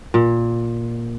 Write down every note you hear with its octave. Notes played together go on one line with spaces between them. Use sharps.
A#2